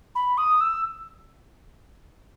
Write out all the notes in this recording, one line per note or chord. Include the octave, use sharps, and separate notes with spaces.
B5
D#6
E6